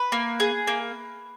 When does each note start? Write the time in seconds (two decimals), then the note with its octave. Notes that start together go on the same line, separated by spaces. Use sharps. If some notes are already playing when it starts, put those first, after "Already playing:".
Already playing: B4
0.12 A#3
0.40 G#4
0.67 A#3